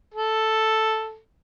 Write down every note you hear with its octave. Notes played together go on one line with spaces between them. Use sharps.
A4